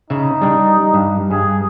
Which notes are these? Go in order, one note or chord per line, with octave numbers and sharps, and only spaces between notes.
C#3 D#4 E5
G3 D4
G2
G2 G#4